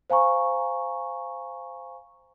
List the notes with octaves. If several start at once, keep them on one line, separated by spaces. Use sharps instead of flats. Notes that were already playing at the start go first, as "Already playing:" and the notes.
C5 F5 G#5 A#5 C#6